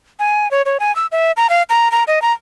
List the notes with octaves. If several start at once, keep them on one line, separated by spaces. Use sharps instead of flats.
G#5
C#5
C#5
G#5
E6
E5
A#5
F5
A#5
A#5
D#5
A#5